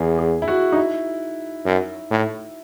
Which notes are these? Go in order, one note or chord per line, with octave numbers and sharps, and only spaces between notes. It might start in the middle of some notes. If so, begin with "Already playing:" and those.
Already playing: E2 G#4
G#4
E4
F#4
D#4
E4
F#2
A2